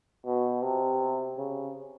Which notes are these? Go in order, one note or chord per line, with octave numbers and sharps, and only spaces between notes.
B2
C3
C#3